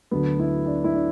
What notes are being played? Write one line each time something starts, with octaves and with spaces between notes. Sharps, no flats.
D2 D3 F#3 B3
E4
D4
E4
D4